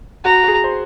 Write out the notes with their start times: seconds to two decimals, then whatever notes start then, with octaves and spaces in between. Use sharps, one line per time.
0.25 F#4 A#5
0.43 F#4
0.48 G#4
0.64 C5